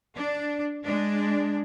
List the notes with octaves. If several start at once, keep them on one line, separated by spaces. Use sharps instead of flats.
D4
G#3 D4